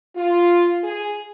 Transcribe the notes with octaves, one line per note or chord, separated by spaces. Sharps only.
F4
G#4